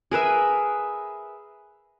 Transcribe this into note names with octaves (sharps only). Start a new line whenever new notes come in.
G#4 A#4 B4 E5